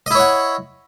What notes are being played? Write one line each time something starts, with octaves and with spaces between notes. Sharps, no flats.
E4 C#5 D#5 F#5